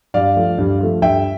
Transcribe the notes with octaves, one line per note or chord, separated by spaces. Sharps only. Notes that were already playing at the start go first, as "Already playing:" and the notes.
G2 D5 F5
F3 A3
G2
F3 A3
G2 E5 G5